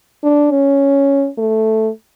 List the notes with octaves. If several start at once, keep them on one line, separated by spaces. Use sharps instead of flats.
D4
C#4
A3